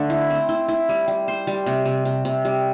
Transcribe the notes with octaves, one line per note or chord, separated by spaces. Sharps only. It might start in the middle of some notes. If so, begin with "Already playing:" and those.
Already playing: D3 A3 A4
E4
C4
E4
E4
G3
G3
C5
G3
C3
C3
C3
C3
G3